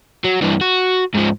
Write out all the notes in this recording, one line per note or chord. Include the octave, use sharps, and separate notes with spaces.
F#3
G2 E3
F#4
G#2 F3